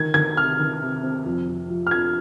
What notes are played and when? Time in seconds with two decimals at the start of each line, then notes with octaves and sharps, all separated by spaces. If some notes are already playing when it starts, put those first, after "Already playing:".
Already playing: D#3 G#6
0.14 D#3 G#6
0.37 C3 F6
0.59 D#3
0.81 C3
1.03 C4
1.25 F2
1.48 F2
1.70 F3
1.87 F6
1.91 F2 G#6